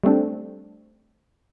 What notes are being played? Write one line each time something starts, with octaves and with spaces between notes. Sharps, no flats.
G3 A3 C4 D4